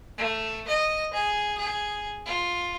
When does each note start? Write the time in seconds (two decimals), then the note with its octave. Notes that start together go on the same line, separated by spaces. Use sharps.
0.17 A3
0.67 D#5
1.13 G#4
1.58 G#4
2.26 F4